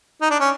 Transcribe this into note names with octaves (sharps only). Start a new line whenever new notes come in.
D#4
D4
C#4